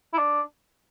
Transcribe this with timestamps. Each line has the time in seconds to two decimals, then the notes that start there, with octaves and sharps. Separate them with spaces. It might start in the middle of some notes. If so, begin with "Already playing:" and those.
0.13 E4
0.18 D4